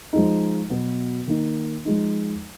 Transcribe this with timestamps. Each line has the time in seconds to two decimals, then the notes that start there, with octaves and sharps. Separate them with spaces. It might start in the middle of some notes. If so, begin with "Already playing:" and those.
0.13 F3 G#3 D#4
0.70 B2 F#3 B3
1.27 D#3 A#3 D#4
1.85 F3 G#3 D#4